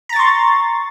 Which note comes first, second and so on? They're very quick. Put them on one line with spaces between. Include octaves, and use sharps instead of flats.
A#5 A6 C#6 C6